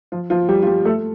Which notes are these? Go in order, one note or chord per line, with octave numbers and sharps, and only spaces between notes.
F3 F4
F3 F4
G3 G4
F4
G3 G4
A3 A4